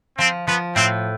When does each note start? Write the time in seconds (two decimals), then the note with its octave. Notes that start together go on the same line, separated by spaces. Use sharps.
0.18 F3 C4
0.47 F3 B3
0.75 A2 C4